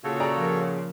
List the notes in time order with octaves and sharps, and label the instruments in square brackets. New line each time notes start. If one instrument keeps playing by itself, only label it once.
[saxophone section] A#2 C#3 [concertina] F#4 A4 C#5
[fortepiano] G#4 D5 A#5
[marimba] F3 A#4